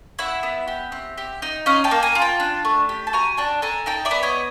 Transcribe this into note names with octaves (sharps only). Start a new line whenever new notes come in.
E4 E5 F#5
B3
G4
C4
G4
D#4
C#4 D#5 F5
G5 A5
A#3
G#5 A#5
F4
G5 A5
D4
A3
G4
A5
F#4 G#5 A#5
D4 G5 A5
A4 G#5 A#5
D#4 G5 A5
D5 E5
B3
C#5 D#5